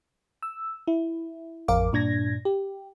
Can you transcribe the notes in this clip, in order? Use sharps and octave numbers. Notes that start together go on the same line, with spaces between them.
E6
E4
A1 F2 A#4 F5 D6
G2 A#2 D4 G#6 A#6
G4